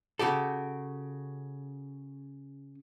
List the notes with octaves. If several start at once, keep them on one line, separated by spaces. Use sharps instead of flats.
C#3 F#4 G4 A4